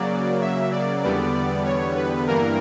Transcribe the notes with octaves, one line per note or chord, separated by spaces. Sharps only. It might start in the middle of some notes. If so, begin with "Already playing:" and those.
Already playing: C#3 F#3 A#3 D5
E5
D5
E2 D3 G3 B3 D5
D5
C#5
B4
G2 E3 G3 A#3 A#4